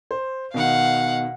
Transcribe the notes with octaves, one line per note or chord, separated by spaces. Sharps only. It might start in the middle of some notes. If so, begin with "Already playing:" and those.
C5
B2 D#3 F5 F#5